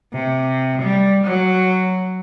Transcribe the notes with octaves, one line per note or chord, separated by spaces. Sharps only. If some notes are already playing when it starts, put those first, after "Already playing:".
C3
G3
F#3